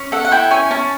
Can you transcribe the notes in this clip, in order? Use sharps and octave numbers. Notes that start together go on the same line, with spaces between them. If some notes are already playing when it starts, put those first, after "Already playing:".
Already playing: C#4
A4 F#5
F#5
E4 G5
C#4 G#5
C#4 A5